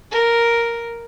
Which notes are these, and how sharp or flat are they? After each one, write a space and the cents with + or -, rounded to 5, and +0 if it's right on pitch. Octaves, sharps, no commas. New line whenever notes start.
A#4 +0